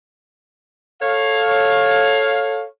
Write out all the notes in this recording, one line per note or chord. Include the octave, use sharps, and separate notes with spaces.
A4 C#5 F5